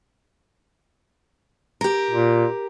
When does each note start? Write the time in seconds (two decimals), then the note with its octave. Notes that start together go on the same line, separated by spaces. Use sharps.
1.81 G4 A#4
2.11 A#2